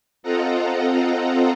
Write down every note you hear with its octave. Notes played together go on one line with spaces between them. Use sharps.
C4 F4 A4 D#5 F#5 A#5